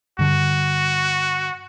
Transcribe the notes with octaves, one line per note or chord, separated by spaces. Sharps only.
G2 D3 F#4